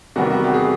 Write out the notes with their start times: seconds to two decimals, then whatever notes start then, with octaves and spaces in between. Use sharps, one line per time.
0.16 E2 C3 D#3 G3 B3 F#4
0.30 F#4
0.44 G4
0.54 G#4